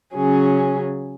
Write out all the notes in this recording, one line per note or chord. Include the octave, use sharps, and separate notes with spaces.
C#3 F#3 C#4 G#4